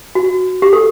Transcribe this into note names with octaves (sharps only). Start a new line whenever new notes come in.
F#4
G4
A4